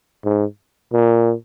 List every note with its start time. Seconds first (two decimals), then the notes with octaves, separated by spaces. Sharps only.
0.24 G#2
0.93 A#2